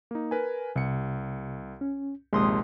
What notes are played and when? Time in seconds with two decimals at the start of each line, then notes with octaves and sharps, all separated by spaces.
0.11 A#3 D#4
0.31 A#4 B4 G#5
0.76 C2 C3 C#7
1.81 C#4
2.33 A#1 D#2 C3 G#3 C6 D#6